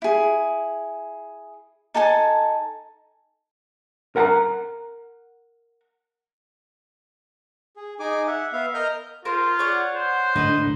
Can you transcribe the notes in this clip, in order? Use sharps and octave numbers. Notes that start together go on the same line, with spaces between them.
E4 G#4
D#4 A4 G#5 A5
A#4 F#5 A5 A#5
G#4
D#4 G#4 G#5 D6
E5 F#5
B3 E5 F5
A#4 D#5 F6 G6
F4 A#4 C5
C#5 D5 F#5
C5
A2 D3 D#4 B4